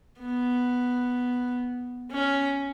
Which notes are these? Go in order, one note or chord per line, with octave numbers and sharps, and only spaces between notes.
B3
C#4